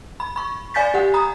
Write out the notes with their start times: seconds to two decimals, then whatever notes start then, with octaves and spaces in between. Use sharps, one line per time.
0.20 B5
0.36 B5 C#6
0.74 D5 F5 G#5 G6 A6 B6
0.94 G4 F#5
1.14 A#5 B5 D#6